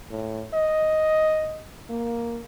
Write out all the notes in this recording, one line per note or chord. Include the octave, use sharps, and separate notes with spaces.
A2
D#5
A#3